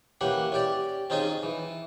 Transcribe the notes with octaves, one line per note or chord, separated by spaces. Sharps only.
E3 A#3 C#4 G4 F#5
C#4 G4 D5
C4 C#4 D#4 F4 G#4 G#5
E3